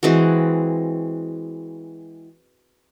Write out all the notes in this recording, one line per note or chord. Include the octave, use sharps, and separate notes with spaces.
E3 G#3 C4 F#4